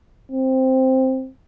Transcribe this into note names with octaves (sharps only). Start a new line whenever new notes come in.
C4